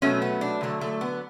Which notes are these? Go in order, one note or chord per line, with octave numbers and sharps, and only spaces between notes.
B2 F#3 A3 C#4
B3
D4
D3 F#3 A3
A3
B3